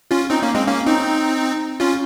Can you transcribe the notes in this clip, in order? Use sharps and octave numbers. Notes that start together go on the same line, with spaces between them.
C#4 F4
C4 D#4
A#3 C#4
G#3 C4
A#3 C#4
C4 D#4
C#4 F4